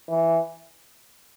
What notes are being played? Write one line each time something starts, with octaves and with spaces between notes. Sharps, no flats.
E3